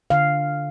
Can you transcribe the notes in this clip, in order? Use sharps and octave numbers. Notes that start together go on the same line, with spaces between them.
D3 F5